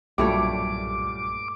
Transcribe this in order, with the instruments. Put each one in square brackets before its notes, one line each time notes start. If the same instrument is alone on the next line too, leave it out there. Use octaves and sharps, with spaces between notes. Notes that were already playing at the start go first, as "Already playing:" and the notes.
[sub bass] B1 [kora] G2 A3 C#5 [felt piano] A#2 F#3 G3 [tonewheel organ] D6